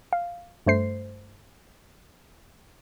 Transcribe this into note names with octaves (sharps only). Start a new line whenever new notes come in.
F5
G2 A3 C5 C7